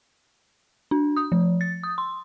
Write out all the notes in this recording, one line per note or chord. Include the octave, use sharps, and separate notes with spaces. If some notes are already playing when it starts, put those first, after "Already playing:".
D4
D#6
F3
A6
D#6
C6